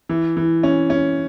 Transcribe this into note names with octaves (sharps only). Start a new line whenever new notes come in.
E3
E3
C#4
C#4